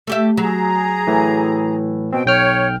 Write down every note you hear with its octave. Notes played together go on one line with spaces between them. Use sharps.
A3 G4 E5
F#3 G#4 A#5
A2 E3
B2 C4 G5
B1 C#5 G5 F6